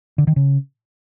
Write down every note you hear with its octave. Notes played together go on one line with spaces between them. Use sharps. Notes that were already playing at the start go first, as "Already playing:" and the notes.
D3
D#3
C#3